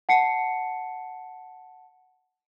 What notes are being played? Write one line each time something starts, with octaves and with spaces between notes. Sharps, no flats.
F#5 A5 C7 C#7